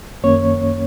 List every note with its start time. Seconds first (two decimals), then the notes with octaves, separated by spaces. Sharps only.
0.23 F#2 D#3 A#3 C#4 C#5